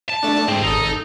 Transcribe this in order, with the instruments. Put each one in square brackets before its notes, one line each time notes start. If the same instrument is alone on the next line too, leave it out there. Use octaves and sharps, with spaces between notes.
[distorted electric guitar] A5
[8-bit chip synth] A3 D4
[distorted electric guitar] D2 C4 [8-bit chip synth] G#2
[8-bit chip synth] G#1 A4 [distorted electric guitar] D#4